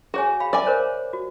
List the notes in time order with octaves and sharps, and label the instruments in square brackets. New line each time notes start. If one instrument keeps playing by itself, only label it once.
[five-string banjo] F#4 [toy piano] G#4 C#5 G#5
[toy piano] F5 G5 B5
[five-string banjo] D5 G#5 [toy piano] E5 D6
[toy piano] A#4 C5 C#5
F#4